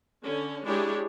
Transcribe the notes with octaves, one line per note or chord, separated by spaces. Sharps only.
D3 C#4
G#3 D4 E4 G4 G#4 C#5